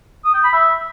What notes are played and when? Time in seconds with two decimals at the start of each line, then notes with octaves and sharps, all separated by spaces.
0.25 D#6
0.34 G5
0.44 B5
0.53 E5